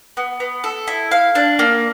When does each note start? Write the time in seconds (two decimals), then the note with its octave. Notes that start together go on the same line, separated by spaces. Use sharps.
0.17 B3
0.40 B3
0.64 A4
0.87 E4
1.11 F5
1.35 D4
1.59 A#3